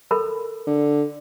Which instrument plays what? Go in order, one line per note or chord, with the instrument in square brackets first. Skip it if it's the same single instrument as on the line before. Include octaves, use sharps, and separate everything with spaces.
[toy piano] A4 A#4 B5
[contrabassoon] D3